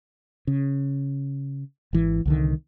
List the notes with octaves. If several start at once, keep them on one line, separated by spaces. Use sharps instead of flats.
C#3
G#1 E3
C2 D3 D#3